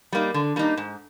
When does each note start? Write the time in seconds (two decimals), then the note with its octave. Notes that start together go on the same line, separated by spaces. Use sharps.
0.12 G3 A#3 D#4
0.34 D3
0.56 G3 A#3 D#4
0.77 G#2